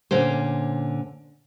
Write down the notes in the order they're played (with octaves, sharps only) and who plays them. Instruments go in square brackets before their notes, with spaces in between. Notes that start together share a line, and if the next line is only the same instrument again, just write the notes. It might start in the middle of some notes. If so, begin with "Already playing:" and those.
[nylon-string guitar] A#2 D3 C#4 C5